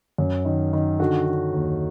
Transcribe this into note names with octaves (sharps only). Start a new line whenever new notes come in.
F#2
D#3
D#3
D3 F#4
D3
D#2